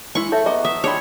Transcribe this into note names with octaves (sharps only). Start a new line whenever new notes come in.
G#3 E4 C#6
A4 C#5 E5
B3 G#4 D#5 A#5
E5 D#6
D4 F4 G4 G#4 C#5 B5